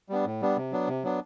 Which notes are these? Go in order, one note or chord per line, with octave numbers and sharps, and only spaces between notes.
G3 B3 D4
A2
G3 B3 D4
C3
F#3 B3 D4
C3
F#3 B3 D4